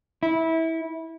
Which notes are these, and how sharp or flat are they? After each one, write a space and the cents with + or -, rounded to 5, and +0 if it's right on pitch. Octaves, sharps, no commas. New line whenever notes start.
E4 -20